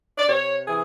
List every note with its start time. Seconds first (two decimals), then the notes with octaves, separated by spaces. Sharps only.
0.17 D5
0.28 C3 C#5
0.66 E3 G#4